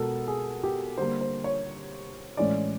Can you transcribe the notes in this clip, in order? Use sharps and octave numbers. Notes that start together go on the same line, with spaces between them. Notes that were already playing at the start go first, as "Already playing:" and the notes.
Already playing: B2 G#3 B3 A4 A#4
G#4
G4
D3 G3 A#3 C5
C5
C#5
A2 E3 G#3 C#4 D5